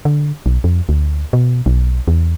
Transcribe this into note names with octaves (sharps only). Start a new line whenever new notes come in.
D3
B1
F2
D2
B2
B1
E2